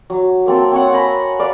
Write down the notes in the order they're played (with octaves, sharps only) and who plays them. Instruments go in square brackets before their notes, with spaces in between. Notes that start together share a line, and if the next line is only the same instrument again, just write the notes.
[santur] F#3
A#3 C4 A4
C4 C#5 F#5
G#5 A#5 B5
B4 D5 F5